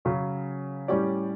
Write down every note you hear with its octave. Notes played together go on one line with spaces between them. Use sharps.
C#3 F#3 C#4
A2 G3 C#4 G4 D5